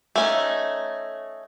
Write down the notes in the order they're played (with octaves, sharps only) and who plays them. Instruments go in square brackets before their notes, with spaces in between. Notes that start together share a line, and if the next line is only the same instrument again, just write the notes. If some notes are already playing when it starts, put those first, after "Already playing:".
[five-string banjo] A3 C#4 D#4